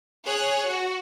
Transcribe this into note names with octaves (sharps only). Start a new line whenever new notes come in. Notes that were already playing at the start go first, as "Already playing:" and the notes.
G#4 C#5 F#6
F#4